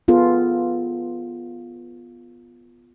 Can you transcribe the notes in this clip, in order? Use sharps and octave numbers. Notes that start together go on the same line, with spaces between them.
B3 F4 G#4 A4 B4